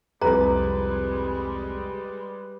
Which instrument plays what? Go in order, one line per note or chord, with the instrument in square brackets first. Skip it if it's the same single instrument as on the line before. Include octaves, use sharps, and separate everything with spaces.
[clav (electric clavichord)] C2 F2 G4 [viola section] G3 G#3 [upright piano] B4 [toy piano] A#5